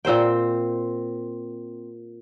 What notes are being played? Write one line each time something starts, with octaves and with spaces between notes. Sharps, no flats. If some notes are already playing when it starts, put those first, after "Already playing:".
A#2 C4 C5 G5